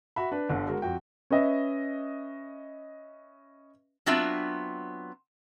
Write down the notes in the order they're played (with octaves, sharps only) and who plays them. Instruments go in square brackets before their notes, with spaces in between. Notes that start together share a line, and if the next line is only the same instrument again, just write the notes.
[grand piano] F#4 E5 B5
D4 B4
G1 D3
G#3 F#4 A#4
F2 F#4 G5
[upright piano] C#4 B4 D#5 E5
[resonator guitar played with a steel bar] F#3 B3 C4 D4 F4 E5